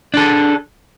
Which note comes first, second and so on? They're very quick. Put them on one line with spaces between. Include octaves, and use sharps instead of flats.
D4 A4 G#4